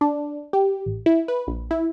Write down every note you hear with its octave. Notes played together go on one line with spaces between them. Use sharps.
D4
G4
A1
E4
B4
A#1
E4